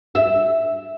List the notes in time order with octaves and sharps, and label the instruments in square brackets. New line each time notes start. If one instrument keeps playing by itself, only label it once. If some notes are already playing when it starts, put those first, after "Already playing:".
[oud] E5